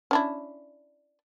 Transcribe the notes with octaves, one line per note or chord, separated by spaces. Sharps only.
C#4 D4 E4